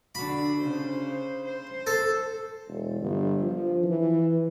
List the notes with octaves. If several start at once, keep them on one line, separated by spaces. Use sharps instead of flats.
D3 D4 F#4 B5
C#3 C5
C5
A4
E1
G1
F3
E3